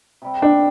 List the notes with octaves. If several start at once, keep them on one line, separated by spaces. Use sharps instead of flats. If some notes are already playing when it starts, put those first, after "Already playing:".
C3 G3 C4
D4